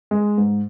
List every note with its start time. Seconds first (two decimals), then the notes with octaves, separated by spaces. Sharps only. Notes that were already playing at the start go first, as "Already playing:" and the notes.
0.11 G#3
0.38 G#2